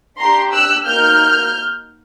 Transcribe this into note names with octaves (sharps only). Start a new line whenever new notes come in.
D4 G4 A#5 C6
E6 F#6
A#3 D#4 F#4 F6 G6